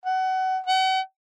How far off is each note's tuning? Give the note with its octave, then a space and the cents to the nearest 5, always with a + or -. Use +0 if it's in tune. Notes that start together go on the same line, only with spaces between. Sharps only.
F#5 +25
F#5 +40